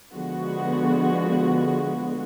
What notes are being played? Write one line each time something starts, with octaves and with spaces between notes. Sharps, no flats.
D3 F3 G#3 B3 F#4